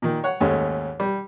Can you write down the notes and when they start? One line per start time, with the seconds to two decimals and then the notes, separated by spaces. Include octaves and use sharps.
0.02 A#2 D#3
0.24 C#5 F#5
0.40 D#2 G#2 A3 C#4
1.00 G3